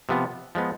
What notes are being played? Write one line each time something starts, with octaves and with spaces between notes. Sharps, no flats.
C3 F3 B3
F3 G#3 B3